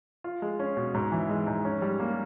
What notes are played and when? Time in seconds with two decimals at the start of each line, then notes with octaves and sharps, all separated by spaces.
0.24 F4
0.42 G#3
0.59 C#4
0.77 B2
0.94 G#2
1.12 E3
1.29 G#3
1.47 G#2
1.65 C#4
1.82 G3
2.00 A#3